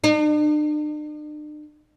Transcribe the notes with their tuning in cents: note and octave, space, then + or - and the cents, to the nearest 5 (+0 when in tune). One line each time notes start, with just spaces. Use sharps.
D4 +45